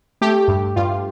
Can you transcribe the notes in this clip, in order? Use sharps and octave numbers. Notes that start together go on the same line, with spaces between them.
A3 G4
G2
G2 F4